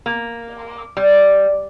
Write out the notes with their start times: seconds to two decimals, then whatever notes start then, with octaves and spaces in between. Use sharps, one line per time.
0.06 A#3
0.97 G3